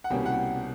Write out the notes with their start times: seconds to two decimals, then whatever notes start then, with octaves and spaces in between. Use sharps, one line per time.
0.04 F#5
0.10 C2 B2 G3 A#3 C#4 G5
0.26 F#5